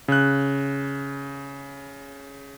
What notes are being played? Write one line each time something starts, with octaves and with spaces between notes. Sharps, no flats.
C#3 F#6